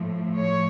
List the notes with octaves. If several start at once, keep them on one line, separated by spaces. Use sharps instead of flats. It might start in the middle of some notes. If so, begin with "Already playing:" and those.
Already playing: A2 F3 A3
C#5